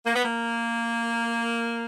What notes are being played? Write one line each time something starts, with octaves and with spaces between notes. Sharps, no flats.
A#3
B3
A#3